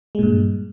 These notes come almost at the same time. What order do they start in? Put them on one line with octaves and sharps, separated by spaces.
G#3 A#2 G2